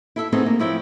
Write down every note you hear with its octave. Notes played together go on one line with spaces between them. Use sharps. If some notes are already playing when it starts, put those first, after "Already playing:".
E4 A4 E5
A3 B3 C4 D#4 G#4 D#5
A#3
F3 E4 C#5 G5